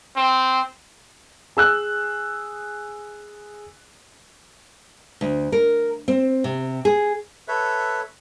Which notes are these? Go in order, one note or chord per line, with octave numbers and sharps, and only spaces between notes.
C4
G#4 E6 F#6
D2
A#4
C4
C3
G#4
A4 B4 C#5 E5